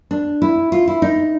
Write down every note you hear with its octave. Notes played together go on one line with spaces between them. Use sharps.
D4
E4
F4
E4
D#4